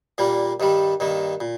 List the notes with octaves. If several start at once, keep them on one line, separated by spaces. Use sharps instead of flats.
A#2 G3 A#3
G2 D#3 G3
G2 D#3 A#3
A#2